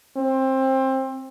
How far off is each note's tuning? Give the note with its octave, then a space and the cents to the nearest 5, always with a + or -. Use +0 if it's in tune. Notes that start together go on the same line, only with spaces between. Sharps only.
C4 +20